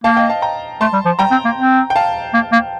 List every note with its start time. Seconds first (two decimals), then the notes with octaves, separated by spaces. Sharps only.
0.04 A#3 F5 A5
0.17 D#5 G5
0.30 F5 A5
0.42 G5 A#5
0.81 A3 A5 C6
0.94 G3
1.06 F3
1.19 G3 G5 A#5
1.31 C4
1.45 A#3
1.57 C4
1.90 G5
1.96 F5 A5
2.34 A#3
2.52 A#3